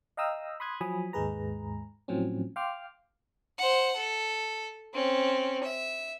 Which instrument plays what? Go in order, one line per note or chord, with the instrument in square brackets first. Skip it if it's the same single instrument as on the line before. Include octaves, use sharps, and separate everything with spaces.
[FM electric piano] D#5 F5 G5 A#5 D#6 E6
B5 C6 D#6 F#6 G#6
F3 F#3 G#5 B5 D#6
D#2 G#2 G#3 G#4 B4 A#5
A2 F3 F#3 C4 C#4
F5 G5 C6 D6 F6
[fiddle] C5 F#5
A4
C4 C#4
E5